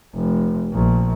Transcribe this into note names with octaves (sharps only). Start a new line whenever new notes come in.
F1
A#1